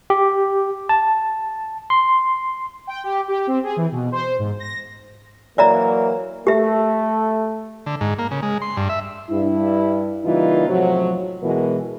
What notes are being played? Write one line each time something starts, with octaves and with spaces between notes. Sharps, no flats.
G4
A5
C6
G5
G4
G4
C4
G#4
E3
B2
C5
G#2
A#6
E3 F#3 A#3 D5 E5 A#5
A3 G4 E5
D3
G#2
A#3
C#3
G#3
C6
G2
E5
G2 E4
C#3 E3 G3 A#3 D#4 F4
A2 C3 F3 F#3
B2 E3 G#3 F#4 A#4